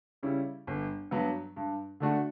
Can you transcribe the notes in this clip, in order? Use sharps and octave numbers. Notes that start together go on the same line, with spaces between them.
C#3 G3 C#4 E4
G1
G2 F#3 B3
G2
D3 A3 D4 F#4